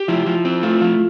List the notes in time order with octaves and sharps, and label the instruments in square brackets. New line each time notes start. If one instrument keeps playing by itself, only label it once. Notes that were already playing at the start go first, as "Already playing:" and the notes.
Already playing: [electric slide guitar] G4
[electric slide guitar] F3 [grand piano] E4
[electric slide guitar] F3
C4
[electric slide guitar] A3 [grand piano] F4
[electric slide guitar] F3 [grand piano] F4